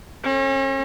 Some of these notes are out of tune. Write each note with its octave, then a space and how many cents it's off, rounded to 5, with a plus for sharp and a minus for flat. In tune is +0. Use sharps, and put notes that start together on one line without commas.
C#4 -40 A4 +0